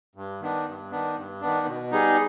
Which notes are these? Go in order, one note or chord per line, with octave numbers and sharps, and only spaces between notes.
G2
D#3 B3 D4
G2
D#3 B3 D4
G2
D#3 B3 D4
B2
G3 B3 D#4 G#4